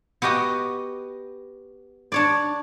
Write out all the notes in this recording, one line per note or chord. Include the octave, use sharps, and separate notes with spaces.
B3 F#4 G4 D#5 A#5
D4 C#5 D5